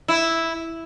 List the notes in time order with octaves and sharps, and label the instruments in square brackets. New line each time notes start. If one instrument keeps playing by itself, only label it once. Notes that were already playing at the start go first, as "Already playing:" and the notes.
[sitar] E4